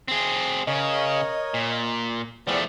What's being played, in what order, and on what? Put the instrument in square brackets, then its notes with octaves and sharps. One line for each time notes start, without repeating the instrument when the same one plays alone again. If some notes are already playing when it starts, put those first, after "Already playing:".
[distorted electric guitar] C4 G#4
[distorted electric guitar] C#3 [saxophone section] A#4 C#5 D#5
[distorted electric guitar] A#2
[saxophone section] E2 C4 D5 [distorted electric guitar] F3 A3